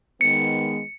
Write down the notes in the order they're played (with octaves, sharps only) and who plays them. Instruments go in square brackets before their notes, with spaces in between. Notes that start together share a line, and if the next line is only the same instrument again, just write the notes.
[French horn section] D#3 G#3 B3 [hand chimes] C#7